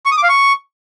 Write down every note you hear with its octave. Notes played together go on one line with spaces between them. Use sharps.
C#6
D#6
D6
F5
C#6